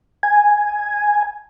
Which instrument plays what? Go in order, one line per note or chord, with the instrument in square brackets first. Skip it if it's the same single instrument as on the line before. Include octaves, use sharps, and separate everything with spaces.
[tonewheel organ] G#5